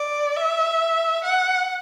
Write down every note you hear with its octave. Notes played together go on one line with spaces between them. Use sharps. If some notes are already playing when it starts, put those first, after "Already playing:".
Already playing: D5
E5
F#5